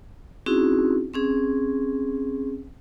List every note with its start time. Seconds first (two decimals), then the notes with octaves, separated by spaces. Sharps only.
0.46 C4 C#4 D#4 E4 F#4 G#4
1.13 C4 C#4 G#4